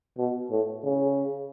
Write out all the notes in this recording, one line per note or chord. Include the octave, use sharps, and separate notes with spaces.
B2
A2
C#3